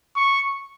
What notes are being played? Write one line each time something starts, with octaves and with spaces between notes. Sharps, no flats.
C#6